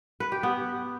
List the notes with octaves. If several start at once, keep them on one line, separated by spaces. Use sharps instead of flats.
B4
G4
B3